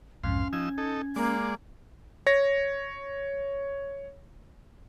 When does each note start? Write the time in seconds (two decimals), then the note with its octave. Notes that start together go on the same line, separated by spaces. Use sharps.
0.24 B1 F2 G#2 C#4 F5 C6
0.53 F3 D#4 E6 G#6
0.78 D#4 A4
1.16 G#3 A#3 D5
2.27 C#5 A#6